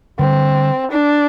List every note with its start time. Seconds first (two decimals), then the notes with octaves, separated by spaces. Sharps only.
0.19 D3 G3 C4 D4
0.91 D4